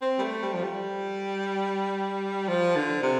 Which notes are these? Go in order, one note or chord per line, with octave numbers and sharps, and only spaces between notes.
C4
G3
A3
G3
F3
G3
F3
D3
C3